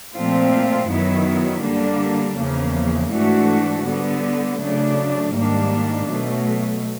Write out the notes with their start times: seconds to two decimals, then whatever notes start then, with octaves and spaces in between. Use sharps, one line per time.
0.13 A#2 F3 A3 C4 F4
0.87 F#2 D#3 F#3 B3 E4
1.61 D3 G3 A#3 D4
2.36 E2 C#3 F3 A#3
3.11 G#2 E3 A3 D4 F#4
3.85 D3 G3 B3
4.58 C#3 F#3 A3 D4
5.32 G#2 D#3 G3 A#3 D4
6.06 B2 F#3 A3